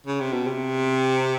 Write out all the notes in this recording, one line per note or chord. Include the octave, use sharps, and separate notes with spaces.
C#3
C3
B2
C3